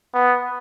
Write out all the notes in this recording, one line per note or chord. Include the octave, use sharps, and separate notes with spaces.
B3